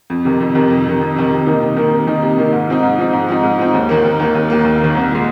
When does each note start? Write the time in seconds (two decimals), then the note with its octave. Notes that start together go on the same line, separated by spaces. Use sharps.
0.10 F2
0.25 C3 D#3
0.40 F2
0.55 C3 D#3
0.70 F2
0.86 C3 D#3
1.01 F2
1.16 C3 D#3
1.31 C3
1.46 D#3 A#3 D#4
1.62 C3
1.77 D#3 A#3 D#4
1.92 C3
2.07 D#3 A#3 D#4
2.22 C3
2.37 D#3 A#3 D#4
2.53 G#2
2.68 F3 C4 D#4
2.83 G#2
2.98 F3 C4 D#4
3.13 G#2
3.28 F3 C4 D#4
3.43 G#2
3.59 F3 C4 D#4
3.74 D#2
3.89 D#3 A#3
4.04 D#2
4.20 D#3 A#3
4.35 D#2
4.50 D#3 A#3
4.65 D#2
4.80 D#3 A#3
4.95 C2
5.10 A#2 G#3